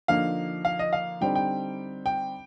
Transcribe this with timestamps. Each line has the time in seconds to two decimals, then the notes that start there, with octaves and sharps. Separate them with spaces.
0.08 D3 F3 A#3 D#4 F5
0.65 F5
0.79 D#5
0.93 F5
1.21 D3 G3 C4 D#4 G5
1.35 G5
2.06 G5